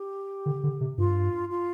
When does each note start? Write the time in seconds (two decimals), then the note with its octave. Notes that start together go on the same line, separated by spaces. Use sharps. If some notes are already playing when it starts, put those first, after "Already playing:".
Already playing: G4
0.46 D3
0.63 D3
0.81 C3
0.98 G2 F4
1.50 F4